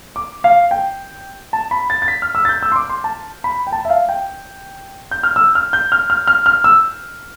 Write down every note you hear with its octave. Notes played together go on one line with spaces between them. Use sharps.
D6
F5
G5
A5
B5
A6
A6
B6
F6
E6
A6
G6
E6
C6
D6
C6
A5
B5
G5
A5
E5
F5
G5
G6
F6
E6
F6
G6
F6
F6
F6
F6
E6